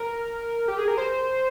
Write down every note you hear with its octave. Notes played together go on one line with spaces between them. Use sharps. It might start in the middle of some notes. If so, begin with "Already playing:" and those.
Already playing: A#4
G4
G#4
A#4
C5